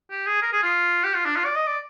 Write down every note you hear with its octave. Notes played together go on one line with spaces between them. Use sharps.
G4
G#4
A#4
G#4
F4
G4
F4
D4
F4
D5
D#5
D5